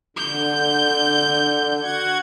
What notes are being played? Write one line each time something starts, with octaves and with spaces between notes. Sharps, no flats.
D3 G6
F#4 F#5 G#6